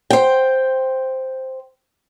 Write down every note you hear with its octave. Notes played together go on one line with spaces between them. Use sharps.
C5 G5